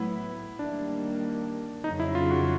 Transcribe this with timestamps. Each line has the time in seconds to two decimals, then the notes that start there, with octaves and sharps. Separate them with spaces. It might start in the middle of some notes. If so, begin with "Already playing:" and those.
Already playing: A2 F#3 B3 E4
0.59 D#3 G3 A#3 D4
1.84 F2 C#3 F#3 D#4
2.00 E4
2.15 F4
2.31 F#4